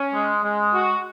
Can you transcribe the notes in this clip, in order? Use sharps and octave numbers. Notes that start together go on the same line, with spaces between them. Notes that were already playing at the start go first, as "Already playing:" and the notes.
Already playing: C#4
G#3
G#3
F#4